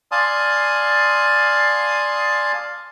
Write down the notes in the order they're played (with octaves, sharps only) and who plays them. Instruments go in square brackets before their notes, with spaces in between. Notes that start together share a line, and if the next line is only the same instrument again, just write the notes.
[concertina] D5 F5 G#5 A5 C6 D#6